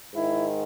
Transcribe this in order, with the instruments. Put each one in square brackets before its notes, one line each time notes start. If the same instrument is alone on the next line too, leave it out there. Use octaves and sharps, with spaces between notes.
[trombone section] G#2 D#3 E4